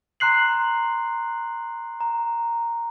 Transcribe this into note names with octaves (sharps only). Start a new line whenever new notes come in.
A#5 C6 F#6 C7 F#7
A#5